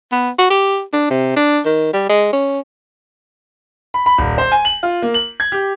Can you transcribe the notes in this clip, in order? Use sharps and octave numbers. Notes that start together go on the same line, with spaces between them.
B3
F#4
G4
D4
C3
D4
D#3
G3
G#3
C#4
B5
B5
D#1
C5
G#5
F#7
F4
A#3
F#7
G#6
G4